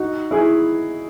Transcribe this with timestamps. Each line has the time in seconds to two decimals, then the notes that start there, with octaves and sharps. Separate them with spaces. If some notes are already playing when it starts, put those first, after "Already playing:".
Already playing: D#4 F#4
0.31 E4 G#4